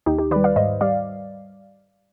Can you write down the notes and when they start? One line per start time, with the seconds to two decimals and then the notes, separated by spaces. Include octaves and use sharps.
0.06 D#2 D#4 G4
0.19 D#4 G4
0.31 D#3 B4 D5
0.36 G3
0.44 D5 F5
0.56 G#2 C5 D#5
0.81 G3 D5 F5